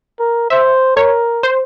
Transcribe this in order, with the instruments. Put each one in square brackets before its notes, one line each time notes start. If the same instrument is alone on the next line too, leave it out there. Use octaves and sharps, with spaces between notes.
[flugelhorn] A#4
[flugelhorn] C5 [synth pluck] E5
[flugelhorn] A#4 [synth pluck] C#5
[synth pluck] C5